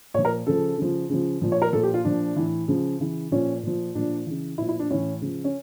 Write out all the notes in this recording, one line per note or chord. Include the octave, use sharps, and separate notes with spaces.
A#2 F3 C#5
A#4
C#3 F3 A4
C#3 F3
C#3 F3
A#2 F3
C#5
A#4
A#2 F3 A4
G4
F4
A#2 F3 D4
A2 E3
C#3 F3
C#3 E3
A#2 F3 C#4
A#2 F3
A#2 F3 D4
C#3 E3
A#2 F3 E4
E4
D4
A2 E3 C#4
C#3 F3
C#4